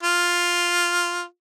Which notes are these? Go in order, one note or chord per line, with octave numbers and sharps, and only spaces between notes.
F4